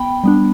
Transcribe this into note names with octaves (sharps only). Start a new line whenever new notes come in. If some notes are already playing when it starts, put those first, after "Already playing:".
Already playing: B3 G5 B5
G3 B3 D4